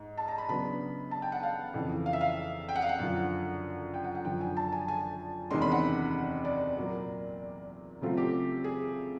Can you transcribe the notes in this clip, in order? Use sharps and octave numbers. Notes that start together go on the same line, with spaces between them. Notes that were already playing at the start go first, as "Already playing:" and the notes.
Already playing: G#2
A5
A#5
B5
C#3 F#3 B3 D4 B5
A5
G5
F#5
F5
F2 C#3 E3
F5
E5
F5
G5
F#5
F5
F#5
F#2 D3 F3
G5
F#5
F#5
F#2 D3 F3 G5
G#5
A5
G#5
G#5
E2 C3 D#3 G#3 C#4 C6
B5
F#5
D5
A#2 F#3 A#3
C#3 F#3 A3 C4 F4
G4
G#4